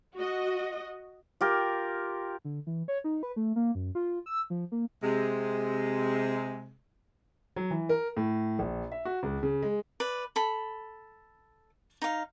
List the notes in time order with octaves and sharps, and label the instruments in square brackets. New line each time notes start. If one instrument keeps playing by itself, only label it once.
[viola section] F#4 D#5
[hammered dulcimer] F4 G4 A#4
[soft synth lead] D3
E3
C#5
D#4
B4
A3
A#3
F#2
F4
E6
F3
A#3
[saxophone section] C3 G#3
[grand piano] F#3
E3
A#4
A2
A#1
E5
F#4
C#2
C#3
G#3
[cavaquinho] B4 D5
A4 B5
D#4 F5